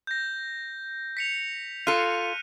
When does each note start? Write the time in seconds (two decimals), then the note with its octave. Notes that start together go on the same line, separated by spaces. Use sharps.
0.07 G6 A#6
1.17 B6 C#7 F7
1.87 F4 A4 F6 F#6 D#7